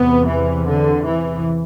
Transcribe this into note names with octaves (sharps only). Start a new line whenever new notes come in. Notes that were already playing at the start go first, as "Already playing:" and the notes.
Already playing: E2 C3 B3
E3
D3
E3